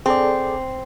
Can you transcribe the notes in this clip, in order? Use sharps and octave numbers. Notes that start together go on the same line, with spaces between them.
C4 G#4 A4 D5